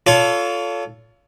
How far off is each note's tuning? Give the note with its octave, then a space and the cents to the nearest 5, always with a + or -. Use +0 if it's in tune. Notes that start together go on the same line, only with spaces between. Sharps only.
F4 +0 A4 +0 C#5 +35